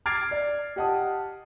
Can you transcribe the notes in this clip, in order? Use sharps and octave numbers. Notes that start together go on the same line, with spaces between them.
D6 F6 G#6 A6 C7 D7
D5
G4 D#5 F#5 A5 D#6